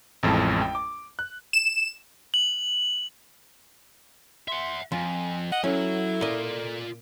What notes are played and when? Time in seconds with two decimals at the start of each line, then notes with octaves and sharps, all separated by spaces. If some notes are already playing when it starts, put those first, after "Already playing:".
0.23 A1 F2 A2 G#3 A5
0.61 G5
0.75 D6
1.19 F#6
1.53 E7
2.34 F#7
4.48 E5 F#5 C6
4.92 F2 F4 G#5
5.52 D#5 F#5
5.64 F#3 C#4 E4 A4
6.21 A#2 F4 D5 D#5